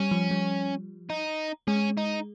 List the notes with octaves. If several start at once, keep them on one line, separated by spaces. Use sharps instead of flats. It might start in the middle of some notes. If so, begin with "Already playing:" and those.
Already playing: G3 C#4
F3
G3
D#4
G#3 C#4
D#4